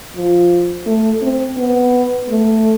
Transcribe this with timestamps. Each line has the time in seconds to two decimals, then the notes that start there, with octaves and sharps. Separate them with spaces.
0.16 F3
0.86 A3
1.21 C4
1.57 B3
2.29 A3